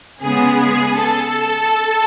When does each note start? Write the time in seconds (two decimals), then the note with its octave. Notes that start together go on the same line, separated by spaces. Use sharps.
0.21 C#3 G#3 B3 G#4
0.59 G#4
0.98 A4